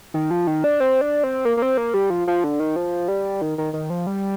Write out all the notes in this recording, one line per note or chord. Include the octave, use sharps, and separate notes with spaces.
D#3
F3
D#3
D4
C4
D4
C4
A#3
A#3
C4
A#3
G3
F3
F3
D3
D#3
F3
G3
D#3
D#3
D#3
F3
G3